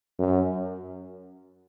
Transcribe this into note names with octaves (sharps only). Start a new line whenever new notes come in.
F#2